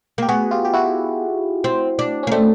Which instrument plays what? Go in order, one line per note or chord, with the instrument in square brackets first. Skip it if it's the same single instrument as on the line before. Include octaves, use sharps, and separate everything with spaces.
[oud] A#3 [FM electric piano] G4
[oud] B3 [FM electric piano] F#4 G#4
[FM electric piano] F4 G4
G4
E4 F#4
[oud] C4
D4
[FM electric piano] C#4
[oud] A#3
[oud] A3 [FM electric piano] C4 D4